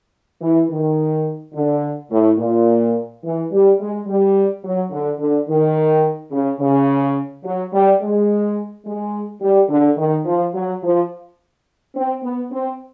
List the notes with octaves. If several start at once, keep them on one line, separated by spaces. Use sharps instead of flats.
E3
D#3
D3
A2
A#2
E3
G3
G#3
G3
F#3
D3
D3
D#3
C#3
C#3
F#3
G3
G#3
G#3
G3
D3
D#3
F3
F#3
F3
C4
B3
C4